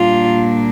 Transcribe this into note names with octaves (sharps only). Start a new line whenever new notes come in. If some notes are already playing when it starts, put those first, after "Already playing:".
Already playing: A#2 G3 A#3 D4 F4